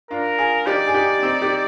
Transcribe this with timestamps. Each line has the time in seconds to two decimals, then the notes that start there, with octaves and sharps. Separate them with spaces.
0.10 D4 F4 A#4
0.38 F4 G#4
0.66 D#4 G4 D5
0.87 G#4
0.94 D#4 G4
1.23 C4 D#4
1.41 D#4 G4